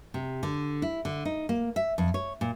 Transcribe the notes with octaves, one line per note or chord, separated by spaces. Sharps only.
C3
D3
E4
D3
D#4
A#3
E5
F2
C#5
A#2